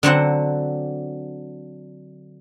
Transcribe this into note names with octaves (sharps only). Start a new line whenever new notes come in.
D3 F#3 C4 F#5